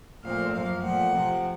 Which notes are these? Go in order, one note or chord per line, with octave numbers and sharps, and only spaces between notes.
A#2 F3 A3 C4 F5
F#2 F3 A#3 F5
A#2 F3 A3 C4 F#5
C3 F3 C4